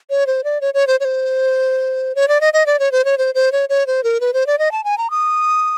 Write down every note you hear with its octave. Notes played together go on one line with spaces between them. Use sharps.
C#5
C5
D5
C#5
C#5
C5
C#5
C5
C#5
D5
D#5
D#5
D5
C#5
C5
C#5
C5
C5
C#5
C#5
C5
A#4
B4
C5
D5
D#5
A5
G#5
A#5
D#6